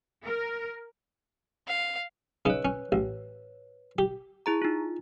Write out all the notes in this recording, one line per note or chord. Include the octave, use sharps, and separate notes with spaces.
A#4
F5
C#3 D#4 B4 C#5
C#4
A1
G4
E4 G#4 A#5
D#4 F4